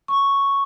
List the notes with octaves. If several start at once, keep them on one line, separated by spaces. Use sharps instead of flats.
C#6